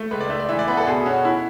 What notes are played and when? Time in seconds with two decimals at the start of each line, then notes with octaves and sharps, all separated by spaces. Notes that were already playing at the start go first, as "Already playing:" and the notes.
Already playing: A3
0.11 C#2 B4
0.21 D5
0.30 A3 E5
0.39 D5
0.49 E3 E5
0.59 D5
0.68 B3 B4
0.77 A4
0.87 B2 G#4
1.06 C#4 F#4
1.25 E4